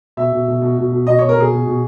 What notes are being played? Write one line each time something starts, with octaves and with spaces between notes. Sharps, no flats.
B2 E5
B2
B2
B2
B2
B2
B2 D#5
B2 C#5
A#4
B2 G#4
B2
B2